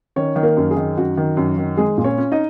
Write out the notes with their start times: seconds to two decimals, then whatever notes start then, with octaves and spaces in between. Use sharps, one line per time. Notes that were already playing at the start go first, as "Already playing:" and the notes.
0.16 D#3 C#4 C#5
0.36 D#3
0.43 A#3 A#4
0.57 F#2
0.71 G#4
0.77 D#3
0.97 F#2 F#4
1.17 D#3
1.37 F#2
1.58 D#3
1.77 G#3 G#4
1.98 A#2
2.04 C#4 C#5
2.18 C#4
2.32 D#4 D#5